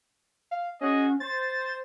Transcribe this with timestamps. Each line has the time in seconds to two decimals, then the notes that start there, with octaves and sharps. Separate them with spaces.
0.51 F5
0.81 C#4 F#4 G#4 D#5
1.20 C5 A6